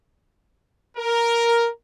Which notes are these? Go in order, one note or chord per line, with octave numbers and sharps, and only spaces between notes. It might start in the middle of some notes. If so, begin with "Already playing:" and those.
A#4